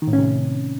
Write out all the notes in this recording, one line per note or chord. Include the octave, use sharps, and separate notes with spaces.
D#3
A2
C#4
C3